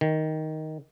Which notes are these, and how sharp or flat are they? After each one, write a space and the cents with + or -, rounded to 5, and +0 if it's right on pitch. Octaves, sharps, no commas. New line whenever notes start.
D#3 +5